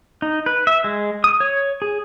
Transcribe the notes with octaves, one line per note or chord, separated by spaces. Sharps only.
D#4
B4
E5
G#3
D#6
C#5
G#4